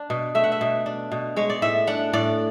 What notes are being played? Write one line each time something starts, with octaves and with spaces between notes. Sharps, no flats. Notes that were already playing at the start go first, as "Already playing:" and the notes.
Already playing: D4
B2
A3 E5
F#5
E5
B2
D4
B2
G#3 C#5
D5
A2 E5
D4 F#5
A2 D5